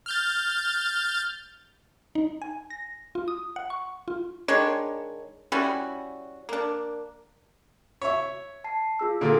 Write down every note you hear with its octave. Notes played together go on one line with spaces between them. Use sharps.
F6 G6 A6
D#4
G#5
A#6
F4
D#6
F#5
C#6
F4
D#3 G#3 D4 C#5
G3 C#4 E4 F#4
A#3 D4
C#5 E5
A5 C7
F4 G#4 E6
A#2 D3 F#4 A4 D7